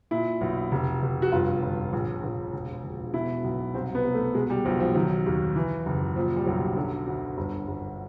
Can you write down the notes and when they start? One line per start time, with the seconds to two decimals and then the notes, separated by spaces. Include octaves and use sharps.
0.11 A#2 E4
0.41 B1
0.71 F1
1.02 F1
1.22 F#4
1.32 G1 F4
1.63 G1
1.93 A#1
2.23 A#1
2.53 E1
2.84 E1
3.14 B2 E4
3.44 B1
3.74 C2 C4
3.95 B3
4.04 C2
4.14 A3
4.34 B2 G#3
4.50 G3
4.65 B1 F3
4.80 F3
4.95 D#3 F#3
5.26 D#2
5.56 E3
5.86 F#1
6.16 A#2 F3
6.36 G3
6.46 B1 F#3
6.76 D3 F#3
7.07 D2
7.37 G1
7.68 G1